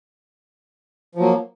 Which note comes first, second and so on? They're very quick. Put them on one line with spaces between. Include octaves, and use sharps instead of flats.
F3 F#3 A#3